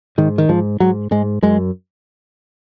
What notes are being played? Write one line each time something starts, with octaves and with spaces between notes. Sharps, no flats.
G#2 D#3
D#3
G#2 F3
G#2 F#3
G#2 G#3
F#2 G#3